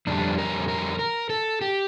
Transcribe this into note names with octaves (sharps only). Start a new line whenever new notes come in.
F2 D3 G3 D4
A#4
A#4
A#4
A4
G4